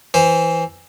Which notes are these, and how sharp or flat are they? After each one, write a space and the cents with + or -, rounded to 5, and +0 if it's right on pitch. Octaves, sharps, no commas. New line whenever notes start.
E3 +0 C5 +10